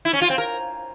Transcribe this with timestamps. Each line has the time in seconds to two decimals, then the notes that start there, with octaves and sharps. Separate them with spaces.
0.05 E4
0.13 C#4
0.22 F4
0.30 C4
0.38 A#4